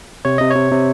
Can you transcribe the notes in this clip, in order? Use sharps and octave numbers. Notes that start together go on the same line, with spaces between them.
C3 C#5
C3 D#5
C3 C#5
C3